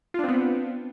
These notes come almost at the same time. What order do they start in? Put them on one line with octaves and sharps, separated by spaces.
F4 D4 C4 B3